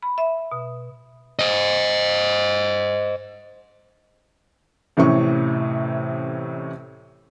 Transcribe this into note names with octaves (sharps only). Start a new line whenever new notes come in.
B5
E5
B2
C5 D#5
A1 A2 C3 E3 C#4 C#6